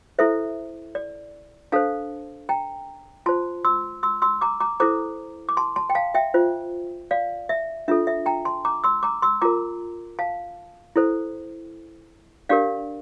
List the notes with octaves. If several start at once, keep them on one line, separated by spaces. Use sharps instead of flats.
E4 A4 C5 E5
D5
D4 A4 C5 F5 A5
G5 A#5
F4 C5 A5 C6
C6 E6
C6 E6
C6 E6
A#5 D6
A#5 D6
E4 A4 C5 A#5 D6
D6
A5 C6
A5 C6
G5
F5 A5
E5 G5
F4 C5
D5 F5
E5
D4 F4 A4 E5
E5
G5 A#5
A5 C6
A#5 D6
C6 E6
A#5 D6
C6 E6
F4 A#4 A#5 D6
F5 A5
E4 A4 C5
D4 G4 A#4 D5 F5